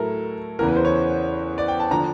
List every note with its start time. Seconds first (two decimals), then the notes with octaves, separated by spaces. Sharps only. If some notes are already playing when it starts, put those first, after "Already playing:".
Already playing: A2 F#3 E4 A4 A#4
0.59 E2 C#3 E3 A#4
0.68 B4
0.76 C5
0.85 C#5
1.58 D5
1.68 G5
1.80 A5
1.91 D3 F3 A#5